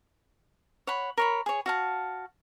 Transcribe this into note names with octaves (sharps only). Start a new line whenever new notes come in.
C#5 F#5 B5
A#4 C#5 B5
G#4 C#5
F#4 F5 A5